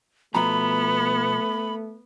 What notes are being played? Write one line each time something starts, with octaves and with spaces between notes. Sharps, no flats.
B2 F3 A3 B3 A#5 B5